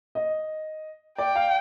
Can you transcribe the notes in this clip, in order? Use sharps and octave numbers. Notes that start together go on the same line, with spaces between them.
D#5
D5 G5
F5